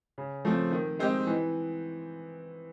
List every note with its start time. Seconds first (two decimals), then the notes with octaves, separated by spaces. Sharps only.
0.18 C#3
0.45 F3 A3 C4
0.71 D#3
0.99 G#3 C4 D#4 G4
1.27 E3